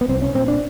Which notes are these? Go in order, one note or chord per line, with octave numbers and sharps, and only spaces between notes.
B3
C2 C4
C#4
A#2 C4
D4